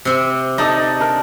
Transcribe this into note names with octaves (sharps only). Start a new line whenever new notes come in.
C3 C4
D#4 A4 D5 D#5
D4 A#4